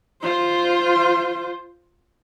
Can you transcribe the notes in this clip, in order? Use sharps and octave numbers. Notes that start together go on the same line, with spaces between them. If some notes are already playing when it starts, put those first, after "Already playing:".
F4 C5